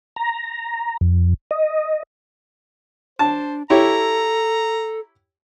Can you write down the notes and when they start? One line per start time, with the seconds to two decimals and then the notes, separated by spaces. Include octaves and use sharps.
0.16 A#5
1.01 F2
1.51 D#5
3.19 D4 C5 A5
3.70 E4 G4 A4 C#5 A#5